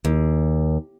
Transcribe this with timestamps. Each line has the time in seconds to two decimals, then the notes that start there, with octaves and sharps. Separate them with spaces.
0.05 D#2